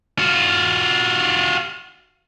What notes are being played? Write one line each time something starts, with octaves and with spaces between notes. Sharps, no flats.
F4 F#4